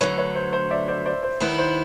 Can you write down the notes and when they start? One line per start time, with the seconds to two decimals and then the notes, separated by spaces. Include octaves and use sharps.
0.01 D2 D3 F#3 A3 B4 C#5
0.18 B4 C#5
0.35 C5
0.53 C5
0.71 D5 E5
0.88 C5 D5
1.06 C5 D5
1.23 C5
1.40 D#2 D#3 G3 B3 E4 B4
1.58 C5